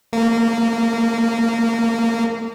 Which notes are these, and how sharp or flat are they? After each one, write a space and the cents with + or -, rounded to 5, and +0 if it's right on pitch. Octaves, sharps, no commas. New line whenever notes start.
A#3 -25